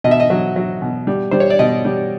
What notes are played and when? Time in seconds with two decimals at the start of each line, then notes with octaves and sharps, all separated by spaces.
0.04 B2 D#5
0.11 E5
0.20 D#5
0.30 F#3
0.56 F#3
0.82 B2
1.07 G3
1.31 G3 C5
1.40 C#5
1.50 D5
1.59 B2 D#5
1.85 G3